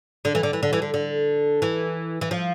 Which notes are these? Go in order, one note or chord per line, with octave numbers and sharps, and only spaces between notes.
D3
E3
D3
E3
D3
E3
D3
D3
E3
E3
F3